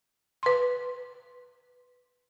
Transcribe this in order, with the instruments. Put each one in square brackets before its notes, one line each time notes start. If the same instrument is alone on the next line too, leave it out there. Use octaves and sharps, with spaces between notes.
[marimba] B4 C6